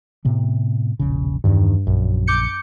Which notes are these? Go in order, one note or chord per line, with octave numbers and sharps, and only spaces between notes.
A2 C3 B3
E1 A#1 C#3
E2 G2 D#3 G3
A#1 F#2
D6 G6 C#7